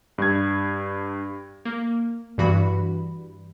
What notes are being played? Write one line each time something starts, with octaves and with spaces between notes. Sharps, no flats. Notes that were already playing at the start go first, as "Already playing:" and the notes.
G2 G#6
A#3
G2 E3 F#4 B5